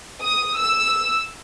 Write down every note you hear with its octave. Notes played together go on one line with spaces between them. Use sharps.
D#6
E6